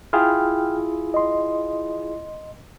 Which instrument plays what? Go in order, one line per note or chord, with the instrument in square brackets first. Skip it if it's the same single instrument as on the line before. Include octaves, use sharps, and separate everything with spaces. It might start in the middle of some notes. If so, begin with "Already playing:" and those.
[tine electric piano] E4 F4 G#4 [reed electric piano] G5 F6
[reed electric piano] D#5 C6